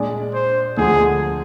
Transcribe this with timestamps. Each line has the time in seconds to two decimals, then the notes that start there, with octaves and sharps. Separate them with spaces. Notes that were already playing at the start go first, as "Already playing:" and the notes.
Already playing: A#2 G#3 D4 G#4 D5
0.34 C5
0.77 D2 D3 F3 G#3 D4 G#4